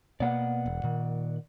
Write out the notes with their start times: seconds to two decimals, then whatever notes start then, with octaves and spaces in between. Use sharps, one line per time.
0.20 B2 A#3 B3 D5 F#5
0.66 E1
0.83 A#2 D#3